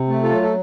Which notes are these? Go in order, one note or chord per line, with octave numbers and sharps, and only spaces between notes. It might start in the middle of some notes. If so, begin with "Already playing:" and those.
Already playing: C3
A3
F4 A4
F#3
A4